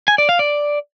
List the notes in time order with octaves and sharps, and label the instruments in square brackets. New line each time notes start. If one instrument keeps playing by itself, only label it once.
[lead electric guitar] G#5
D5
F5
D5